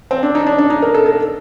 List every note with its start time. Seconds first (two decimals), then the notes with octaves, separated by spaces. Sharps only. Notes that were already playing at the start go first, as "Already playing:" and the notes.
0.11 C4
0.23 D4
0.35 D#4
0.46 D4
0.58 D4
0.70 D#4
0.82 A#4
0.94 A4
1.06 A4